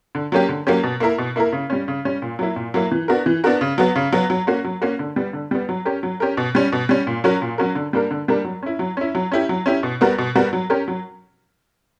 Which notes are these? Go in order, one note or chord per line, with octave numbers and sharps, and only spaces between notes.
D3
F#3 A#3 C#4 G4
D3
F#3 A#3 C#4 G4
B2
A#3 E4 A#4
B2
A#3 E4 A#4
C#3
G3 C#4
C#3
G3 C#4
A#2
F#3 A#3 E4
A#2
F#3 A#3 E4
E3
B3 D4 F#4 A#4
E3
B3 D4 F#4 A#4
C#3
F#3 B3 F#4
C#3
F#3 B3 F#4
F#3
A#3 C#4 F#4
F#3
A#3 C#4 F#4
D3
G3 B3
D3
G3 B3
F#3
C#4 G4 A#4
F#3
C#4 G4 A#4
B2
G3 C#4
B2
G3 C#4
A#2
F#3 C#4 F#4 A#4
A#2
F#3 C#4 F#4 A#4
D3
G3 A#3 D4 A#4
D3
G3 A#3 D4 A#4
F#3
C#4 E4
F#3
C#4 E4
F#3
C#4 E4 G4
F#3
C#4 E4 G4
B2
G3 B3 F#4 A#4
B2
G3 B3 F#4 A#4
F#3
C#4 G4 A#4
F#3